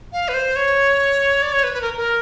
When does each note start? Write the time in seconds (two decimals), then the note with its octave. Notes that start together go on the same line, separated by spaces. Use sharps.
0.13 F5
0.28 B4
0.34 C5
0.56 C#5
1.42 D5
1.53 C#5
1.64 B4
1.74 B4
1.82 A#4
1.97 A#4